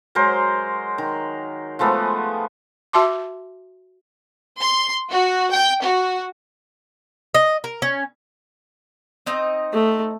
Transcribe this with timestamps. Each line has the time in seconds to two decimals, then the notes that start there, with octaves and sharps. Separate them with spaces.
0.15 F#3 G#3 A#4 C5
0.98 D#3
1.79 F3 G#3 A3 B3
2.93 F#4 E5 A5 C6 D6
4.58 C6
5.11 F#4
5.52 G5
5.82 F#4
7.34 D#5
7.64 A#4
7.82 C#4
9.26 C4 D#4 D#5
9.73 A3